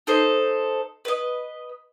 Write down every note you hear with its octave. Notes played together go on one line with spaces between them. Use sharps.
D#4 A4 C5
B4 D#5